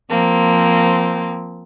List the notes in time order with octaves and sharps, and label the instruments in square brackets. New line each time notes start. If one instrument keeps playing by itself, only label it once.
[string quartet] F3 A#3 C4